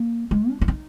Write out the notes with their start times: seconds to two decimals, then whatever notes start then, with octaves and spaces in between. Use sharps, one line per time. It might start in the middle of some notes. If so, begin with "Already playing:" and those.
Already playing: A#3
0.31 G#3
0.50 D4
0.61 D4
0.68 D#4